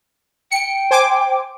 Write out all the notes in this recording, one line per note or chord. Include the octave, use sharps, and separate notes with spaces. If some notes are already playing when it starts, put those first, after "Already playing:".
G5 C#7
C5 G#5 D6